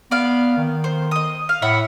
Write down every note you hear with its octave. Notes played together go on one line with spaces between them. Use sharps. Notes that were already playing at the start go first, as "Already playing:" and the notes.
B3 D5 F5
D#3
C5
D#5 D#6
F5
A2 E5 F#5 B5